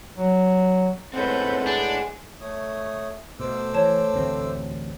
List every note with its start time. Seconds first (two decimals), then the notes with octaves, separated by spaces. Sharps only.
0.16 F#3
1.14 A2 G#3 C4 C#4 A4 B4 F#5 G6
1.66 D4 G#4
2.41 A3 C#5 D#6
3.40 B2 A3 C5 D6 E6
3.74 E3 C#5 A5
4.14 A1 D2 C4